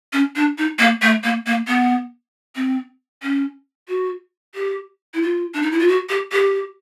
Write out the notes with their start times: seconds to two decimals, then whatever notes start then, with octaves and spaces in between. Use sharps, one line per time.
0.13 C#4
0.36 D4
0.58 D#4
0.79 A#3
1.02 A3
1.24 A#3
1.46 A#3
1.68 B3
2.56 C4
3.23 C#4
3.88 F#4
4.55 G4
5.14 E4
5.22 F4
5.54 D4
5.62 D#4
5.71 E4
5.79 F4
5.88 F#4
6.09 G4
6.32 G4